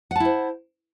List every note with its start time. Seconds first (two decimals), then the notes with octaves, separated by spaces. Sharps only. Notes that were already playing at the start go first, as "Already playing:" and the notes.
0.11 F#5
0.16 A5
0.20 E4
0.25 C5